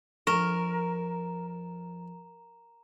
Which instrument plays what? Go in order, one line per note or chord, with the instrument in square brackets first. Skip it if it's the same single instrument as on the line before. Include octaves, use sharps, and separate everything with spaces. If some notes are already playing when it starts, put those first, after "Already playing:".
[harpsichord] F2 [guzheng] A#4 [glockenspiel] A#5 E7 [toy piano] C#6